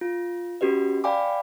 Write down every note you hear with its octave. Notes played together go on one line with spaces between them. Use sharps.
F4
C#4 F#4 G4 B4 D#5
D5 F5 G5 G#5 B5 D6